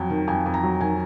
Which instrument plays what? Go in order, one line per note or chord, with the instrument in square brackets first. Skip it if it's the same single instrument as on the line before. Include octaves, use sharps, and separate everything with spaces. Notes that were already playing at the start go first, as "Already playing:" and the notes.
Already playing: [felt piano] F2 F#3
D#3
F2 G#5
F2
A#5
F#3
D#3 G#5